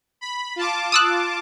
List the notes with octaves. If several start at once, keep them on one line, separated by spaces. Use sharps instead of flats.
B5
F4 A5 D6
D#6 E6 F#6